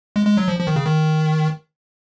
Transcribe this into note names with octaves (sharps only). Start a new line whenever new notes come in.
G#3
G#3
F#3
F3
F3
D#3
C#3
D#3